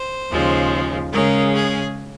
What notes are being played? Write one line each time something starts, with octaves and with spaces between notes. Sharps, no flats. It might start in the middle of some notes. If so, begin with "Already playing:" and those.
Already playing: C5
D#2 C#3 F3 G#3
C#3 G#3 C#4 A#4
G#4